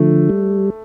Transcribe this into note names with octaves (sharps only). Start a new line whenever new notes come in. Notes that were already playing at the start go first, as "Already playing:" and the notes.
Already playing: D3 F3 A3
G3